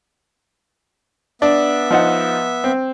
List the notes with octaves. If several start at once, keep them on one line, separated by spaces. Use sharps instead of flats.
B3 D4 E5
F3 D#4 F#5
C4